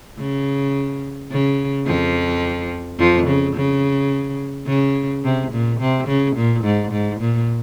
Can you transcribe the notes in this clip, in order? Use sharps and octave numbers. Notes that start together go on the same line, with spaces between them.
C#3
C#3
F2 F3
F2 F3
C#3
C#3
C#3
C3
A#2
C3
C#3
A#2
G#2
G#2
A#2